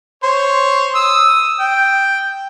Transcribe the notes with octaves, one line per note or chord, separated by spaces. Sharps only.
C5 C#5
D#6 E6
G5